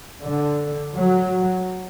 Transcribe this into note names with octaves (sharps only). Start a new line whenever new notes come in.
D3
F#3